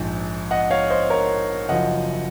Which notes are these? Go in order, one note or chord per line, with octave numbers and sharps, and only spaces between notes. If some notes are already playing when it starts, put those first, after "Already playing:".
Already playing: A#1 G#2 F3
D#5 F#5
C#5 F5
C5 D#5
A#4 C#5
F#1 F#2 F3 D#5 F#5